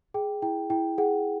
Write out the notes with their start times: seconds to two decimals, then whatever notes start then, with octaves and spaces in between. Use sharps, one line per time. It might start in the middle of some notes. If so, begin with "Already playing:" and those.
0.14 G#4 G5
0.42 E4 G5
0.70 E4 G5
0.98 G#4 F#5